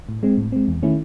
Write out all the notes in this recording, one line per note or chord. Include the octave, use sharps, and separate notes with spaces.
A2
G#3 C4
A2
G#3 C4
E2
D#3 A3 C#4 E4